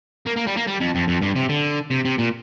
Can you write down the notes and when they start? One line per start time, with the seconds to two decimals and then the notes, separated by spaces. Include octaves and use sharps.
0.26 A#3
0.36 A#3
0.47 G3
0.56 A#3
0.67 G3
0.80 F2
0.95 F2
1.08 F2
1.22 G2
1.36 C3
1.49 D3
1.91 C3
2.05 C3
2.18 A#2